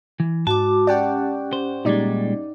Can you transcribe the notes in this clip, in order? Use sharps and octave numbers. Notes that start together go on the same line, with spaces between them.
E3
G#2 F#4 A5 D6
C#4 G4 D5 F#5 G5
C5
A#2 G3 G#3 D#4 D5